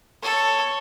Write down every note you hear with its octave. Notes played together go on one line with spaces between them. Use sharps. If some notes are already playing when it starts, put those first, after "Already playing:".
A4 C#5